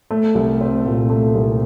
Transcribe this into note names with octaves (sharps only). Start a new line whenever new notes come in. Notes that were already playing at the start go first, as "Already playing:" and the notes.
A3
C2
C4
A#2
A3
C2